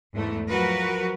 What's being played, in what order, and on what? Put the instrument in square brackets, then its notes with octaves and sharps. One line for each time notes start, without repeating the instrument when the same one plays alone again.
[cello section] E2 G#2 E3 A3
F3 F#3 F#4 A#4 B4